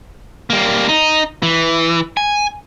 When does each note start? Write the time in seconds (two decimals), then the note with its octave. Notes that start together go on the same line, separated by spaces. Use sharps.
0.50 G3 A#3
0.89 D#4
1.43 E3
2.17 G#5